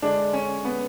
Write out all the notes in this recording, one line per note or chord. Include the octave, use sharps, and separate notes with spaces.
D3 G#3 D4
C#4
B3